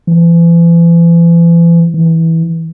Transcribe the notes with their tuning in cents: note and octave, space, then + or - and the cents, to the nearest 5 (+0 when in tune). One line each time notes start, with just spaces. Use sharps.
E3 +40
E3 -15